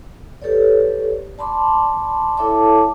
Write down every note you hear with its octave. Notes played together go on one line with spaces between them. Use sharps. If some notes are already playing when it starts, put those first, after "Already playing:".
G4 A4 B4 C#5 D5
D5 A5 B5 C6 D6
E4 A4 C#5 E5 A5 D6